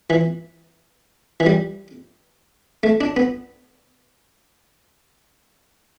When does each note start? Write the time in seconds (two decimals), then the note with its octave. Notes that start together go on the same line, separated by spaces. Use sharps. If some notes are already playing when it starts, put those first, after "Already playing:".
0.10 E3
1.40 E3
1.46 G3
2.83 A3
3.01 D4
3.17 B3